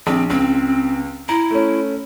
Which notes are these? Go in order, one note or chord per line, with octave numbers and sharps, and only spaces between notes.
A#1 C4
C#2 C4
E4 A#5
A3 C#4